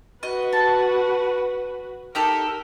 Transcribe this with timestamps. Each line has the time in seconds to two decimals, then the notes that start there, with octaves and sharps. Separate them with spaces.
0.23 F#4 B4 D#5
0.53 A5
2.15 D#4 G4 A4 A#4